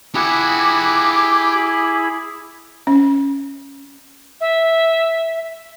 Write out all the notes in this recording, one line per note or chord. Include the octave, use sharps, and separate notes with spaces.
E4 G4 G#4 F#5 B5 D6
C#4
E5